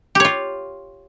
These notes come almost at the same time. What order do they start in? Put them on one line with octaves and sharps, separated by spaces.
G4 C#5 F4